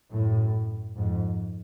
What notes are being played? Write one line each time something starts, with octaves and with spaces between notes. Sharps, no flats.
F#2 A2
F2 G#2